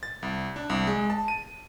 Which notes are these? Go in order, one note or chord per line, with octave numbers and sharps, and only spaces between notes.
A6
C2
D4
C2
G#3
A5
D#7